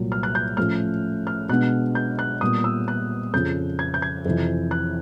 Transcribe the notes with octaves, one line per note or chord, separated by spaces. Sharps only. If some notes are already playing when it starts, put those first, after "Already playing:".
Already playing: C2 A#2 F#3
F6
F#6
G6
A2 F3 A3 C#4 F6
F6
B2 G#3 B3 D4 F#6
G6
F#6
A#2 G3 B3 D#6
E6
F#6
F2 C#3 F3 G6
G#6
G6
G#6
F2 C3 E3
F#6